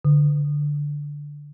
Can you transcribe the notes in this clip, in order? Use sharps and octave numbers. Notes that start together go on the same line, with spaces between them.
D3